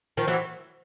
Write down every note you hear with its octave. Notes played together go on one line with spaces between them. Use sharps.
D#3 F3
E3 F#3